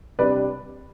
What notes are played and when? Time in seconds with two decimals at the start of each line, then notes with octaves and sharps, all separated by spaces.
0.19 C3 G3 D4 B4 D5